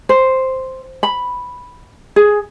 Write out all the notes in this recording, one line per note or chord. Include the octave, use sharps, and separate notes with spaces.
C5
B5
G#4